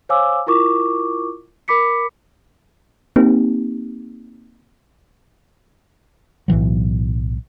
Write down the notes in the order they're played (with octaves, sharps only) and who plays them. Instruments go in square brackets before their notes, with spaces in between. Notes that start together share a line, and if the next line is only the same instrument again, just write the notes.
[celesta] C5 C#5 F5 G#5 D6 E6
E4 F4 A#4 C#6 D6
A#4 B5 D6 B6 C#7
[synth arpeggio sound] A#3 C4 D#4 G4
[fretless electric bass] B1 A2 E3 F#3